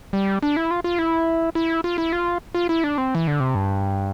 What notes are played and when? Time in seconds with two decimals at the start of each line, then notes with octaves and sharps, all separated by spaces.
0.13 G3
0.43 D4
0.56 E4
0.71 F4
0.84 F4
0.99 E4
1.55 E4
1.84 F4
1.98 E4
2.13 F4
2.55 F4
2.69 E4
2.84 D4
2.98 C4
3.15 E3
3.28 D3
3.40 C3
3.55 G2